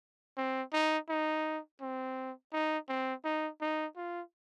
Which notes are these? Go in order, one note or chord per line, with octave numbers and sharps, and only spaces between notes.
C4
D#4
D#4
C4
D#4
C4
D#4
D#4
F4